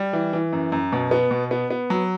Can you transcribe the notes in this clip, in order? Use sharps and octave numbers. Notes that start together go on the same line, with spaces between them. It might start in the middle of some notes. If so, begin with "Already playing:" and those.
Already playing: G3
E3
E3
F#2
F#2
B2
B3
B2
B3
B3
F#3